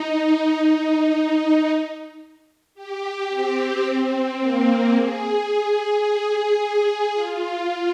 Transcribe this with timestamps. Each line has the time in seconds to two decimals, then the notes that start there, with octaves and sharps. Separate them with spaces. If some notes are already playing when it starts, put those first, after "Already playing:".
Already playing: D#4
0.56 D#4
2.75 G4
3.30 C4
4.40 A#3
4.94 G#4
6.04 G#4
7.14 F4